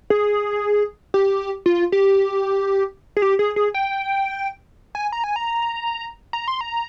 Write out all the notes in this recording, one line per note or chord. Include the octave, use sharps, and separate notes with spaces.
G#4
G4
F4
G4
G#4
G4
G#4
G#4
G5
G#5
A#5
G#5
A#5
A#5
C6
A#5